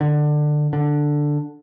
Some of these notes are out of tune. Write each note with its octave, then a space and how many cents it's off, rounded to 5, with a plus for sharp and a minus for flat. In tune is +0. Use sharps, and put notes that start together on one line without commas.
D3 +20
D3 +5